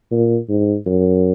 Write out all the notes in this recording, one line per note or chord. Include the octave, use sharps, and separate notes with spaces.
A#2
G#2
F#2